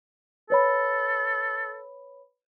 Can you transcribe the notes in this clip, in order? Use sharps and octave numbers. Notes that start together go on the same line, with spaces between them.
A4 B4 C#5 B5